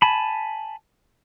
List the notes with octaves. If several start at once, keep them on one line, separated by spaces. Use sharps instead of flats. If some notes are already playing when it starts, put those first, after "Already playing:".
G#5 A5 B5